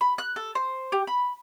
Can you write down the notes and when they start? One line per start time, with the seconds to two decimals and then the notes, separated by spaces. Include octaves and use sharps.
0.01 B5
0.18 F#6
0.36 A4
0.55 C5
0.92 G4
1.07 B5